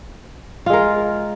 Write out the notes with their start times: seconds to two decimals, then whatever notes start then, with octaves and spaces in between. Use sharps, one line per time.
0.66 F4
0.70 G#3
0.73 A#4